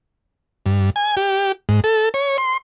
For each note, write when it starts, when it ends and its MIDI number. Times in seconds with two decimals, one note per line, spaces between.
0.66 0.90 43
0.96 1.15 80
1.17 1.52 67
1.69 1.80 44
1.84 2.09 69
2.14 2.37 73
2.38 2.57 84